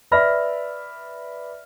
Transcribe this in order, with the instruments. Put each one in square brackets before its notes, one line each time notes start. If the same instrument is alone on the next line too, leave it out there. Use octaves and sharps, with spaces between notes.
[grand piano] B4 D5 E5 B5 F6 A#6